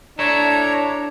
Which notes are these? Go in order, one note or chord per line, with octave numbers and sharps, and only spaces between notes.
D4 E4 A4 C#5 A#5